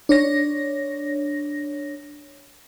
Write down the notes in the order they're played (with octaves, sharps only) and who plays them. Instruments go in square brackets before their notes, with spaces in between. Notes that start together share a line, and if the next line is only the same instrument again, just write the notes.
[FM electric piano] D4 C#5 A#6